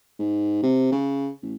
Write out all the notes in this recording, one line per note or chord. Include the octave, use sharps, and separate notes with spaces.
G#2
C3
C#3
A1